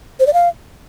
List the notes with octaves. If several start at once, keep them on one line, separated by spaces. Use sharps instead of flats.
C5
D5
F5